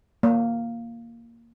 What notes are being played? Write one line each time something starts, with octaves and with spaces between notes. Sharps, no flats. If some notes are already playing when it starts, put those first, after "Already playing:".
A#3